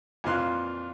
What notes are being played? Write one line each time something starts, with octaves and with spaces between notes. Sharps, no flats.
F2 A#2 E3 F4 C6 F#6